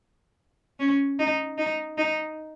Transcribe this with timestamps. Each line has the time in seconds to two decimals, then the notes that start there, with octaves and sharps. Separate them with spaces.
0.79 C#4
1.19 D#4
1.58 D#4
1.98 D#4